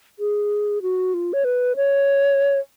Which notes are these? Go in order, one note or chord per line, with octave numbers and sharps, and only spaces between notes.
G#4
F#4
F4
C#5
B4
C#5